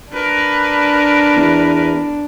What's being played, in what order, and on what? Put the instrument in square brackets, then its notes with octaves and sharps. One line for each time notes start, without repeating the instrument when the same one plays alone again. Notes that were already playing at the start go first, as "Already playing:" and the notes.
[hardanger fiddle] D4 [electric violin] A#4 B4
[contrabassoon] E2